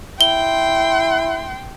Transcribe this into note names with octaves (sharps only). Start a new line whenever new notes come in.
E4 G5 C6 G7